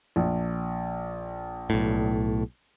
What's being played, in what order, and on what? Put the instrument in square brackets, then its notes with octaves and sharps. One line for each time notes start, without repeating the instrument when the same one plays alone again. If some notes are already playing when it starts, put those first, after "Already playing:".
[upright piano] A#1
[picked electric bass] B1 A2